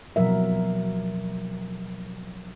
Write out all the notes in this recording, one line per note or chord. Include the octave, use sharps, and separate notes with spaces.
B2 F3 F#3 A#4 E5